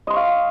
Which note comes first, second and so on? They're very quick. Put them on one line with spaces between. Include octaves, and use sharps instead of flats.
D#5 C6 C#6 F5